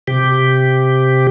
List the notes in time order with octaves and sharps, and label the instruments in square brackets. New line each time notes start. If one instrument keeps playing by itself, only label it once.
[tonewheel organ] C3 G4